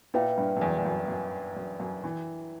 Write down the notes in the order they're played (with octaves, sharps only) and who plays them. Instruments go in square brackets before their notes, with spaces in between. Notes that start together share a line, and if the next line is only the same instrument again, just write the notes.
[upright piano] A#2 [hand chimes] E4 B4 E5 G5
[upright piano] G2
F#2
E2
E2
F#2
F#2
F#2
F#2
E3